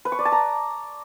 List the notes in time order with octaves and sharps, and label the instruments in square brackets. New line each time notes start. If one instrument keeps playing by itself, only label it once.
[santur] B4
C#6
D5
A5
A#5